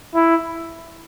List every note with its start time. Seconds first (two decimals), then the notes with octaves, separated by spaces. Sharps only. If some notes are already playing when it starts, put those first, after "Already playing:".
0.15 E4